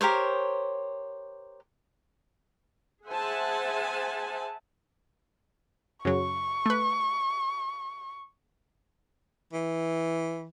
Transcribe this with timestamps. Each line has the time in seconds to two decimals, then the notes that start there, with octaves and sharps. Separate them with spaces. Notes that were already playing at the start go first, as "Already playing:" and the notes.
0.01 G4 A#4 C5 C#5
3.07 G#4 C5 E5 F#5 G#5 A5
6.05 F#2 C#3 F#3 C#6
6.66 A3 B4
9.53 E3